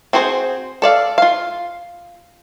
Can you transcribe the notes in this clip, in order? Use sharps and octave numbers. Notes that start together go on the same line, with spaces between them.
C4 F#4 G#4 C5
A4 D5 F5
F4 F5